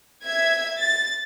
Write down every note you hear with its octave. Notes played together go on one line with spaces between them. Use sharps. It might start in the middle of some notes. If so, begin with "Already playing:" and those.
E5 G#6
A6